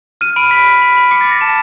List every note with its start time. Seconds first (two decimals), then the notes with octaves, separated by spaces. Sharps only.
0.21 F6 D#7
0.36 B5 D7
0.51 B5 B6
0.66 F6
0.82 B5
0.97 B5
1.11 D6 C#7
1.21 A6
1.26 B5
1.31 A#6
1.41 A5 E7